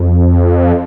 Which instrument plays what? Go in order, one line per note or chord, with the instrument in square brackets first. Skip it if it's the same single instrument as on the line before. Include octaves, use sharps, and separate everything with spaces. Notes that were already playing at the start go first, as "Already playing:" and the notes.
Already playing: [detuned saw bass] F2